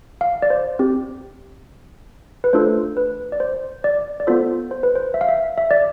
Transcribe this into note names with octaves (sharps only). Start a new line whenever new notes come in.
F5
D5
C5
C4 G4
B4
A3 D4 F4 A4 C5
B4
D5
C5
D5
D5
B3 F4 A4 C5
C5
B4
C5
E5
F5
E5
E5
D5